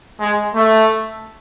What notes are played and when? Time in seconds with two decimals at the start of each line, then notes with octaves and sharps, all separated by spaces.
0.20 G#3
0.55 A3